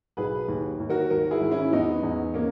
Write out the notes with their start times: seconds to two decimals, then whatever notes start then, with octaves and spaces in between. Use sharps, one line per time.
0.17 B1 G#4 B4
0.48 D#2
0.80 D#2
0.89 F#4 A#4
1.10 G#1 F#4 A#4
1.31 E4 G#4
1.41 G#1
1.51 C#4 E4
1.73 E2 B3 D#4
2.03 E2
2.34 A#3 C#4